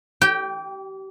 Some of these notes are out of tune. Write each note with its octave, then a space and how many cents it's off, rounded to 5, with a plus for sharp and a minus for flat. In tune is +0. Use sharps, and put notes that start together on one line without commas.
G4 -30 G5 +0